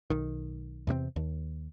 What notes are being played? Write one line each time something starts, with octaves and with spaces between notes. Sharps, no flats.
B1 D#3
E2 C3 A#3 C4
D#2